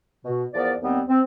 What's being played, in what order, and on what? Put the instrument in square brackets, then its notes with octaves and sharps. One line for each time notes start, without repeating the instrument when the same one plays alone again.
[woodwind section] B2
E2 F3 B3 A#4 D5
D#2 G3 B3 C4
C4